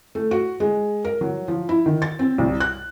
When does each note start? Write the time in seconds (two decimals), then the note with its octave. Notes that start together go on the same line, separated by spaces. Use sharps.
0.15 A3
0.31 F#4
0.60 G#3
1.05 A#4
1.21 F#3
1.48 F3
1.69 E4
1.86 D#3
2.02 A6
2.19 C4
2.38 C2
2.60 F#6